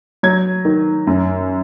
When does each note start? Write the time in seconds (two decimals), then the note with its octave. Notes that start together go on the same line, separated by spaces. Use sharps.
0.23 F#3 G#6
0.65 D#3
1.07 F#2